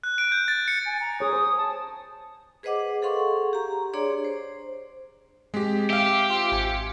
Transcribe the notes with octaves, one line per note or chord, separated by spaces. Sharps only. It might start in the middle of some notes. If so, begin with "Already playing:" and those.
F#6
D7
G6
A6
C#7
G#5
A#5
G#4 C#5 D#6
C5
A5
G#4 B4 C5 D#5 F#5 D6
G#4 A4 F5 F#5 C6 C#6
G4 A#5
D4 G#4 C#5 D5 C6
C5
G#3 C4 G4 B6
G4 E5 F5
F4 C5 C6
G#1 G#5 C#7